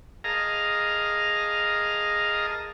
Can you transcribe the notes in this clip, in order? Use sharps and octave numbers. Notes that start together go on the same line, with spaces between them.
G#4 A#4 D#5 F5 A5 A#5